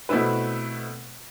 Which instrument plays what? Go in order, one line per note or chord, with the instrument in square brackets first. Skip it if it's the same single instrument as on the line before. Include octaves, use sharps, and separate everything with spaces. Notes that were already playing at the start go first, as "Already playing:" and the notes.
[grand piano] B2 A3 C4 E4 B4